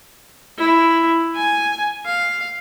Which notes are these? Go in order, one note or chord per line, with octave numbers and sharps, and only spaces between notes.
E4
G#5
F5